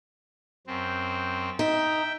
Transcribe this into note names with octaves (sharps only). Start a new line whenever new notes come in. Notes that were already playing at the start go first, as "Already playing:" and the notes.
F#2 C4
D#4 E5 G5